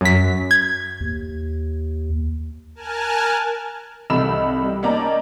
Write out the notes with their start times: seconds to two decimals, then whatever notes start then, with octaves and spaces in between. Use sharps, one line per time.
0.01 F#2 B6
0.51 G#6
1.01 D#2
2.75 A#4 G#5 A5 F6 F#6
4.10 C2 D#4 A4 B5 E6 E7
4.63 G3
4.83 A#3 C#4 D#4 D5 A5 A#5